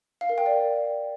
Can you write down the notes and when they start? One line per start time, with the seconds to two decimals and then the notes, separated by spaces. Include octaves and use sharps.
0.21 F5
0.29 A#4
0.38 G5
0.46 D5